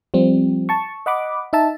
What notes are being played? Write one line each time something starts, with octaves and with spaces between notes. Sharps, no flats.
F3 G3 C4
A5 C#6
D#5 F#5 B5 D6
D#4 E5 A5